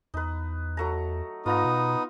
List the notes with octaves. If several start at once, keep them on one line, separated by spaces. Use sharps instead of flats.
E2 D#4 B4
F#3 A3 A#5
G#2 B3 D#4 F4 A#5 D#6
B2